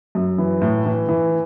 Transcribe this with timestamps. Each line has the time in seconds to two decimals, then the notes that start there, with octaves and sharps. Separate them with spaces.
0.15 F#2
0.38 E3
0.61 A2
0.86 E3
1.08 E3